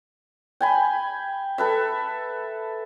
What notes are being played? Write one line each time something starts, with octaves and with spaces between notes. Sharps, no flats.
G5 G#5 B5
A4 B4 E5